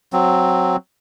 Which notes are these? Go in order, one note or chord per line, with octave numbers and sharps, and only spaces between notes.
F#3 C4